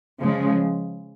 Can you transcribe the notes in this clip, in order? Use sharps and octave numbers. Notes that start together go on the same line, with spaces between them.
C#3 F3 G#3